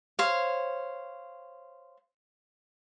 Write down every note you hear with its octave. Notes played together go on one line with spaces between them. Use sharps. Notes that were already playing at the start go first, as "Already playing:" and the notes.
C5 C#5 F5